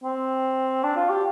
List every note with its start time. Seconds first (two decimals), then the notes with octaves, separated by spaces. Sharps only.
0.04 C4
0.84 D4
0.96 F4
1.10 G4